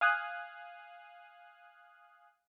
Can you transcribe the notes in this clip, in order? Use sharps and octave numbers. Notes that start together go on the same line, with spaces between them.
F5 G#5 D#6 F#6